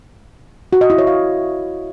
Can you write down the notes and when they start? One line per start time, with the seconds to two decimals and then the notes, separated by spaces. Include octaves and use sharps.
0.73 F#4
0.81 D#5
0.90 E4
0.98 C#5
1.07 F5